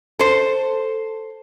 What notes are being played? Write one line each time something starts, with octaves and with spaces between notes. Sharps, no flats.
A4 C5